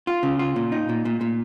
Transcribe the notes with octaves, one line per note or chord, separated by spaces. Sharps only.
F4
C#3
F4
A#2
D#4
A#2
A#2
A#2